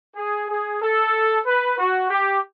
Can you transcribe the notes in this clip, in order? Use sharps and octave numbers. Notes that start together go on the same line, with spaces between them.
G#4
G#4
A4
B4
F#4
G4